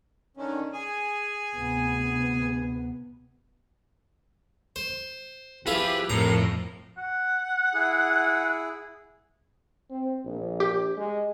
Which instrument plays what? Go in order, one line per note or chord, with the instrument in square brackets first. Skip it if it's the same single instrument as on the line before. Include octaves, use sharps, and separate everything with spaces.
[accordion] D3 D#3 C#4
G#4 G#5
[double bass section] D2 C3 B3
[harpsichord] C5
[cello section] F3 G4 [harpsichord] E4 F4 G#4 [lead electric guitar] B4
[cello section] F2 A#4 [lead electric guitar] A2 [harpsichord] A#5
[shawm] F#5
[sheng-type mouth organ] E4 G#4
[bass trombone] C4
A#1
[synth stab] G4
[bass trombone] G#3